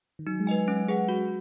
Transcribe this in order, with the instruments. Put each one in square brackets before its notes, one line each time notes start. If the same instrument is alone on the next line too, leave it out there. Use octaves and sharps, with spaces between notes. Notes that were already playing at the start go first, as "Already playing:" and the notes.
[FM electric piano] D#3
[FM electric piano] F#3 [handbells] D#4
[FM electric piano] G#3
[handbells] B4 D#5 G#5
C#4
G#4 B4 F#5
F#4